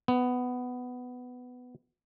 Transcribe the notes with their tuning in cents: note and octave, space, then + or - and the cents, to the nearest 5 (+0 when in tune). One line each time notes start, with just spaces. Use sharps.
B3 +10